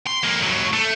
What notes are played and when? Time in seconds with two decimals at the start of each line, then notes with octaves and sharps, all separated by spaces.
0.07 C6
0.24 F2 A#3
0.43 D#2 F#3
0.73 A3